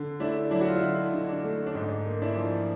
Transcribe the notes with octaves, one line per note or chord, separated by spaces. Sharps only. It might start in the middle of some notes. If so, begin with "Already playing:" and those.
Already playing: D3
A3 D4 E4
F#3 D4 E4
F#4
F4
E4
D3 D#4
D3
D4
A3
D4
G#2 D#4
A#3
D4 E4
F3